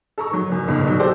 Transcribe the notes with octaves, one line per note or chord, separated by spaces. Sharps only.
A4 A#5 C#6
D#3 F#3
F#1 F#2
F#1 C#2 G#2 B2 D3
C2 B2 D3 D#3 F#3
F#4 G4 A4 C5 D5